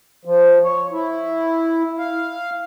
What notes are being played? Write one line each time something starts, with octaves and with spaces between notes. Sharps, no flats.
F3
C#5
E4
F5